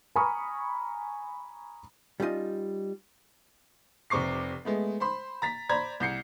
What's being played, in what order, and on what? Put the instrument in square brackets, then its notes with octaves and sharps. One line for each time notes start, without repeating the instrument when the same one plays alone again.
[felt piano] G#5 A#5 B5 C#6 D#6 F6
[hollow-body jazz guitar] G3 C#4 D#4 F4 D#5
[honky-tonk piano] F1 C3 C#6 D6 C7
G#3 A3 B3
C5 B5 C6
A#5 A6 B6
C5 D5 A#5 B5 G#6
C2 G6 C7 C#7